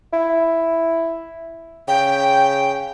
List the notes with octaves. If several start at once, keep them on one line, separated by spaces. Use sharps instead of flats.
E4
C#3 G5